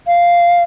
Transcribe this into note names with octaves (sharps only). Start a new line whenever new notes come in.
F5